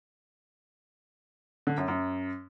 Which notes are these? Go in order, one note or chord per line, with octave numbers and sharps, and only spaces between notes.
D3
F#2
F#2